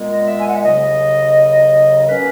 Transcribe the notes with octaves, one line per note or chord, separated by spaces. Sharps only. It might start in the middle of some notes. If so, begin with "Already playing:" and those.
Already playing: A#2 G#3 B3
D#5
E5
G#5
F#5
E5
D#2 C#3 F#3 D#5
B2 A#3 C#4 B4